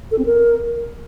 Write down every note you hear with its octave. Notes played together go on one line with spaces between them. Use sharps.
A4
C4
A#4